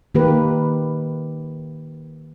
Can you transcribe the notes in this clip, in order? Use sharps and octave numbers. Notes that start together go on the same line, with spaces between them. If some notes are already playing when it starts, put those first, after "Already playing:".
D#3 A#3 G4 B4